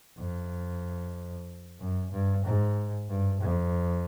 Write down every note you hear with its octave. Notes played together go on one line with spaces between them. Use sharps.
F2
F#2
G2
G#2
G2
F2